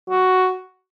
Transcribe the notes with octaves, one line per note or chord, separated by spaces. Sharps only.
F#4